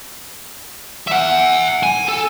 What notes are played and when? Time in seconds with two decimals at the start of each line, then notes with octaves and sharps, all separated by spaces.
1.07 E5 F#5
1.83 G#5
2.08 A4